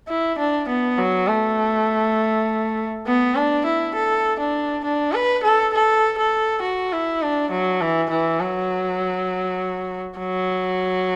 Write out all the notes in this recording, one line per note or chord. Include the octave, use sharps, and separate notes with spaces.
E4
D4
B3
F#3
A3
B3
D4
E4
A4
D4
D4
B4
A4
A4
A4
F#4
E4
D4
F#3
E3
E3
F#3
F#3